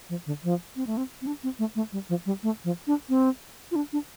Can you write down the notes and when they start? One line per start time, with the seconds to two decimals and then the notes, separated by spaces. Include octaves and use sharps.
0.09 F3
0.26 D3
0.44 F3
0.76 C4
0.87 A3
0.97 C4
1.22 C4
1.27 D4
1.43 C4
1.59 A3
1.76 A3
1.92 G3
2.09 F3
2.26 G3
2.43 A3
2.64 F3
2.87 D4
3.09 C4
3.71 F4
3.76 D4
3.93 D4